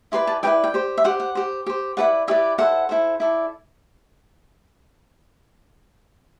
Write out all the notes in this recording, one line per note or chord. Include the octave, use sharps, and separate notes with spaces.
E4 G4 B4 D5 C6
A5
E4 G4 B4 D5 G5
G5
G4 C5
E5
G4 C5 F#5
F#5
G4 C5
G4 C5
E4 G4 B4 D5 F#5
E4 G4 B4 D5 E5
E4 A4 C5 F#5
E4 A4 C5
E4 A4 D5